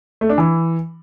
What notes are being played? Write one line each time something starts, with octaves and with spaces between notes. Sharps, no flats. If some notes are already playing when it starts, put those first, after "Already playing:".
A3
D4
E3